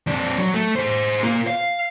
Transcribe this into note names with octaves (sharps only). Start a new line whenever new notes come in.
F2 D4
F#3
A3
G#4 C5
A#3 F4
F5